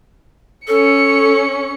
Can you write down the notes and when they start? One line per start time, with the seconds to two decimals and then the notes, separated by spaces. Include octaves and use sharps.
0.68 C#4 A4 C#7